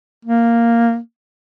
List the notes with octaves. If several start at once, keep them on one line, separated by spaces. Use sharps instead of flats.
A#3